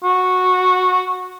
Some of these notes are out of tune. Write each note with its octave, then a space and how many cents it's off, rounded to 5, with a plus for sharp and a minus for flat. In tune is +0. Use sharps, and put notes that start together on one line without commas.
F#4 -10